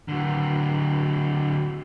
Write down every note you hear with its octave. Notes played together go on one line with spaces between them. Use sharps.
D3 F#3